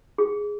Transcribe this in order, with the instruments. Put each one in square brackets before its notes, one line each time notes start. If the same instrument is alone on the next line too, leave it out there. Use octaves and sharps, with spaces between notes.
[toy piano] G#4